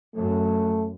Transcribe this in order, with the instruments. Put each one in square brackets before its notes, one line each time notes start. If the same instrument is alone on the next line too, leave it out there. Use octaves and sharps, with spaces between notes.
[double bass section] F#2 [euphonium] A3